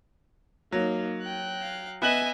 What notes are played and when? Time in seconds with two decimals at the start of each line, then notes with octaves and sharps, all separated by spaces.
0.72 F#3 A#3 D#4
1.22 G5 F#6
1.61 F5
2.02 B3 D#5 E5 G#5 F#6 F#7